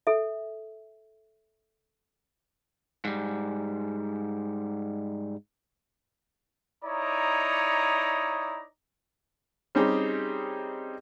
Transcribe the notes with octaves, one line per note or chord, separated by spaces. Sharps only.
A4 E5
G#2 G3
D#4 E4 C#5 D5 A#5 D#6
G3 C4 C#4 D#4 G4 G#4